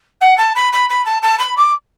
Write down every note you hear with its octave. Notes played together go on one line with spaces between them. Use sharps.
F#5
A5
B5
B5
B5
A5
A5
B5
D6